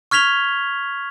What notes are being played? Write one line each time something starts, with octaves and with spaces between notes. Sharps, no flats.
C#6 F6 G#6 B6 F7 G7